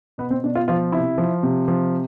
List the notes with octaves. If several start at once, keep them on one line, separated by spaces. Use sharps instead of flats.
B2 B3
C4
B2 D4
F4
F3 F4
C3 E4
F3
C3
F3